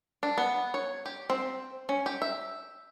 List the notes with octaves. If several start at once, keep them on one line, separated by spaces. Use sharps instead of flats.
D4
B3
C#5
G4
C4
C#4
G4
E5